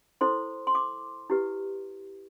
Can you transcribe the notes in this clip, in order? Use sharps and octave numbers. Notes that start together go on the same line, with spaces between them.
E4 A4 C5 C6
C6
D6
E4 G4 B4